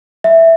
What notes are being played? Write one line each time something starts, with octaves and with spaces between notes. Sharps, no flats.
E5